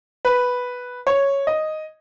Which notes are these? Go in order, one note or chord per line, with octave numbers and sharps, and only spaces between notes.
B4
C#5
D#5